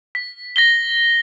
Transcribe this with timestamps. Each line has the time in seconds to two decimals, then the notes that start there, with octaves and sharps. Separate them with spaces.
0.15 B6
0.56 A#6 B6 G7